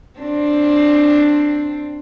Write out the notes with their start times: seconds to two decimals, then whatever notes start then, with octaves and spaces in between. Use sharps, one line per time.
0.20 C4 D4